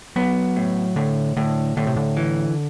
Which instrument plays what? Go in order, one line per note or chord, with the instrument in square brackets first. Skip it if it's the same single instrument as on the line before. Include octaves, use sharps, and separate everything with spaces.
[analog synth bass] F#3 [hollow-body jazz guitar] B3
[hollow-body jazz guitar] A2
[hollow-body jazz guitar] A2 [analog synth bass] D3
[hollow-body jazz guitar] A2 [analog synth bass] D3
[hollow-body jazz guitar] A2 [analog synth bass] D3
[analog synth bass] C3
D3
[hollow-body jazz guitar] E3